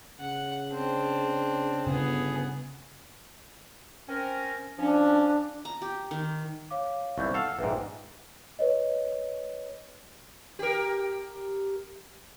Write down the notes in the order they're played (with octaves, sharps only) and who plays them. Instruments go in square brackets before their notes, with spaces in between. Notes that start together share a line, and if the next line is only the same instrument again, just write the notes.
[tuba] C#3 [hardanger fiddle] F#5
[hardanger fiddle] C4 D4
[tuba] G1 [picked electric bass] C#3 [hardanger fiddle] B3 G#4
[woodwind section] C4 C#4 A#4
[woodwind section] F3 C#4 [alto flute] D4
[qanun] A#5
G4
D#3
[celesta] C#5 F5 D6
[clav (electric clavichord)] C2 E3 [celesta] C#6 G6
[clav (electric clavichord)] A4 F5 [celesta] F#5 E6
[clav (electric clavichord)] A#1 G#2 [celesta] B4 E5 G5
[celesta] B4 C#5 D#5
[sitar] G4 A#4